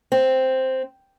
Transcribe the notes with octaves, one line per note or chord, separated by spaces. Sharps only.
C4